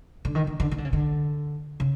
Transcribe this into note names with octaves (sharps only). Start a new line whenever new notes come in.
D3
D#3
D3
D3
D#3
D3
C#3
D3
C#3